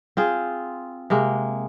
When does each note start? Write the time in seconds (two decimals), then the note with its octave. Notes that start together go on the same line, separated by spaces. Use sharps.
0.17 C4 F4 G#4
1.10 C3 G#3 A#3